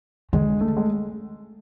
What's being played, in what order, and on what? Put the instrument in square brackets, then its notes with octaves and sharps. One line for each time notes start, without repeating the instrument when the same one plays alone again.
[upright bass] D3 [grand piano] G#3
[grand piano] A3
G#3